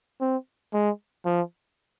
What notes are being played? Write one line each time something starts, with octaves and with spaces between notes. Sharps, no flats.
C4
G#3
F3